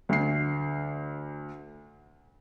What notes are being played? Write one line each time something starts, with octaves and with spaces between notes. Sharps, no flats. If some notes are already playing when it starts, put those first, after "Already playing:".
D2 C7